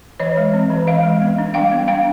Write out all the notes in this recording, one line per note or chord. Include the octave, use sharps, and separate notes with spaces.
E3 C#5 D#5
G#3
C4
E3
E3 D#5 F5
G#3
B3
D4
G3 F5 G5
B3
D4 F5 G5